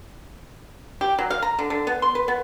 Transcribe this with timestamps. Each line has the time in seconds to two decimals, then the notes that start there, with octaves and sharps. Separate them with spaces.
1.01 G4
1.19 F#3
1.30 F5
1.42 A#5
1.59 D3
1.70 D3
1.87 B3
2.02 C6
2.15 B4
2.28 B3